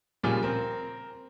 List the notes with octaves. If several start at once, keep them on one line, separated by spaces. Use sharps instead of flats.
A#2 C#3 F3 G3 F4 G#4
C4 A#4